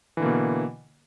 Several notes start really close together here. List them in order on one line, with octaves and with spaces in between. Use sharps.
E3 D3 A#3 B2